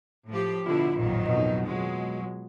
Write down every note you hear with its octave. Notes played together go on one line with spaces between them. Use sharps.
A2 F3 G4
B2 D3 E4 F4
A1 F2 A#2 D#3 F#3
B2 D#4 D#5
B2 F#3 G#3